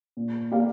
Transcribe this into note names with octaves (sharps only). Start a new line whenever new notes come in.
A#2
A#3 G4 D5 F5